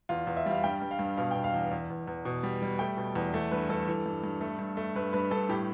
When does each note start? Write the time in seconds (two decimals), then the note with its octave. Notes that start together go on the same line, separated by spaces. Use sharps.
0.09 E2 F4
0.27 E2
0.37 E5
0.46 G3 F5
0.64 G2 G5
0.82 G2
0.91 F5
0.99 G2
1.17 B2 F5
1.31 B2 G5
1.44 F5
1.54 E2
1.71 E2
1.90 E2
2.07 E2
2.25 B2
2.43 G3
2.62 G3
2.79 A3 G5
2.97 B2
3.15 E2
3.34 A3
3.52 G2 B4
3.69 G2 A4
3.88 E3
4.06 G2
4.24 G2
4.41 A3
4.59 G2
4.77 A3
4.96 G2 B4
5.13 G2 B4
5.31 G2 A4
5.49 A2 G4